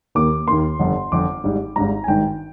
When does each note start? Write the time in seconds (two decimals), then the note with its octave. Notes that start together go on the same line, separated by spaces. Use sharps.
0.15 D#2 D#3 A#3 D6
0.47 D#2 D#3 A#3 C6
0.79 G1 F2 D3
1.12 G1 F2 D3 D6
1.44 G#1 G#2 G3
1.76 G#1 G#2 G3 A#5
2.04 G#5
2.08 G#1 G2 D#3 G5